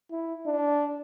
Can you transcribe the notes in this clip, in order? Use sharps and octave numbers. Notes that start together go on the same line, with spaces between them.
E4
D4